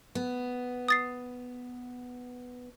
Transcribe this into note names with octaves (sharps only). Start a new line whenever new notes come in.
B3
D#6 A6 C7